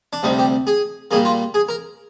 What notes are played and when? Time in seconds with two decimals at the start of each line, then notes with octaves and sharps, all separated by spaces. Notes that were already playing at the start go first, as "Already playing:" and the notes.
0.13 D4
0.23 D2 C3 G3 D#4
0.39 G4
0.67 G#4
1.11 A#2 G3 A#3 G#4
1.25 F4
1.54 G#4
1.69 A#4